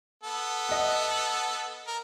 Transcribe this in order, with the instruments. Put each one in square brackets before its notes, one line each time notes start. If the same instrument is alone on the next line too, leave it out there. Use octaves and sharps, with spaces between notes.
[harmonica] B3 A4
[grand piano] D#5 F#5
[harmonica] A#4